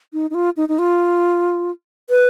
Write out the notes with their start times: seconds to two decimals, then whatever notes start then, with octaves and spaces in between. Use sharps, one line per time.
0.13 D#4
0.30 D#4
0.34 F4
0.57 D#4
0.69 D#4
0.79 F4
2.10 B4